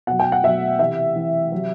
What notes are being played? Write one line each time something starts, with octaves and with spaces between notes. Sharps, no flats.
B2 F#3 F#5
G5
F#5
B2 F#3 E5
C3 E3 E5
C3 E3
C3 F#3